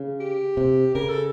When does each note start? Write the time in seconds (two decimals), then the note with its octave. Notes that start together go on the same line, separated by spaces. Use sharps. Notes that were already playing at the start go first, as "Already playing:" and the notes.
Already playing: C#3
0.20 G4
0.57 C3
0.95 C#3 A#4
1.09 A4